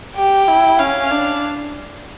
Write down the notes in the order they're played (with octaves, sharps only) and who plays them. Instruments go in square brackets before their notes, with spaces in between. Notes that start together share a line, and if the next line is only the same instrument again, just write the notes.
[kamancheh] G4 [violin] G5
[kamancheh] E4
[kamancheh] C#4 [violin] F5
[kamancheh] D4